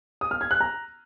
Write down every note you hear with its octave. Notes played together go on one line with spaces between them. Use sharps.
D#6
F6
G#6
F#6
A#5